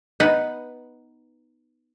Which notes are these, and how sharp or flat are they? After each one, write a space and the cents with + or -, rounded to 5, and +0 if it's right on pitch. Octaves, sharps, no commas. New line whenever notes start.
B3 +0 D#4 +0 B4 -5